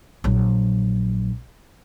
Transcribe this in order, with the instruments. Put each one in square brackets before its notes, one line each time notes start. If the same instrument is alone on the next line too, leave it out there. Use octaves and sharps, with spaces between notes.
[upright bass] A#1 F#3